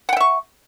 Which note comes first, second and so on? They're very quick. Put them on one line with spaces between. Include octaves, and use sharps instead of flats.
F#5 G5 E5 C#6